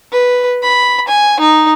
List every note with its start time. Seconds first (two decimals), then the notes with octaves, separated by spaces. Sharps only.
0.12 B4
0.63 B5
1.08 G#5
1.40 D#4